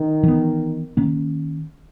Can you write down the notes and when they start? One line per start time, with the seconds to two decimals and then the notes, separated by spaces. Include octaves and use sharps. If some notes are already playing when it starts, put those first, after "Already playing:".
Already playing: D#3
0.23 E3 B3
0.97 D#3 A#3 C#4